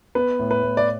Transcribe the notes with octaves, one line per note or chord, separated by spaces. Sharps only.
B3 B4
A2
B4
A2
D5